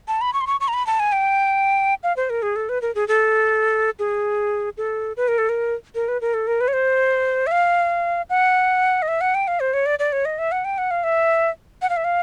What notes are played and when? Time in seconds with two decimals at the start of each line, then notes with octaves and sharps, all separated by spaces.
0.08 A5
0.21 B5
0.34 C#6
0.41 C6
0.47 C#6
0.60 C#6
0.68 A#5
0.74 B5
0.87 A5
1.00 G#5
1.12 G5
2.03 F5
2.17 C5
2.30 A#4
2.42 G#4
2.56 A4
2.69 B4
2.82 A#4
2.95 G#4
3.08 A4
3.99 G#4
4.77 A4
5.17 B4
5.28 A#4
5.38 A4
5.49 A#4
5.95 A#4
6.08 B4
6.21 A#4
6.34 A4
6.47 A#4
6.61 B4
6.68 C#5
6.73 C5
7.47 E5
7.51 F5
8.30 F#5
9.02 D#5
9.08 E5
9.21 F#5
9.35 G5
9.48 F5
9.60 C5
9.74 C#5
9.86 D5
9.99 D5
10.12 C#5
10.25 D#5
10.39 E5
10.52 F#5
10.65 G5
10.78 F#5
10.91 F5
11.04 E5
11.82 F#5
11.90 F5
11.97 E5
12.04 F5